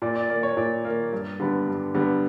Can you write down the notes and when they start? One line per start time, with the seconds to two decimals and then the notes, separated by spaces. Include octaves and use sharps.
0.02 A#2 D5
0.16 D5
0.29 A#3 D5
0.43 C#5
0.57 A#2 D5
0.85 A#3
1.12 G2
1.40 D3 G3 B3
1.68 G2
1.94 D3 G3 B3